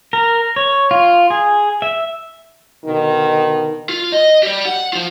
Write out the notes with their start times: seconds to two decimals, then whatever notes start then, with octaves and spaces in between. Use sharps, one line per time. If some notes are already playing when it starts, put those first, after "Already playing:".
0.13 A#4
0.56 C#5
0.91 F4
1.30 G#4
1.82 E5
2.84 B2 D3 D#3
3.89 F4
4.12 D#5
4.43 G4 D5
4.66 F#5
4.93 F3 F4